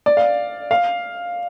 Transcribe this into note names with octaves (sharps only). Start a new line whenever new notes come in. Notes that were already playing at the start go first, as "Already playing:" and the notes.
D5
F5
F5